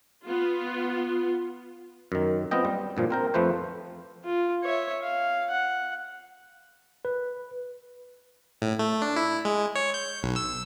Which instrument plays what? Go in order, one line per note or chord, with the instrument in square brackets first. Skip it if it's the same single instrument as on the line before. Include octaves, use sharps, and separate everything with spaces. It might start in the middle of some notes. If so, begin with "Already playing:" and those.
[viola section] B3 F4
[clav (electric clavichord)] F#2 D#3
B3 C4 F4 D#5 G5
G3
G2 A#2 F3
C4 A#4 G5
F2 F3 A3 B4 C5
[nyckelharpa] F4
C#5 E5
F5
F#5
[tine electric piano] B4
[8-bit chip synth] A2
A3
D4
E4
G#3
C#5
G6
B1
E6